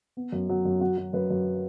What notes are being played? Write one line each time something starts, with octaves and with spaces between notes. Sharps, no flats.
B3
F#2
F#3
F#2
F#3 F#4
F#3
F#2 B4
F#2